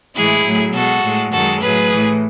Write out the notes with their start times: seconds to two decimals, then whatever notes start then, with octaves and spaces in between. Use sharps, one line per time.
0.16 A2 E3 G#3 E4 G#4
0.45 A2 F#3 A3
0.74 B2 G#3 F#4 A4
1.04 A2 G#3
1.32 F#2 D#3 G#3 F#4 A4
1.62 A2 F#3 A3 G#4 B4
1.91 A2 E3 A3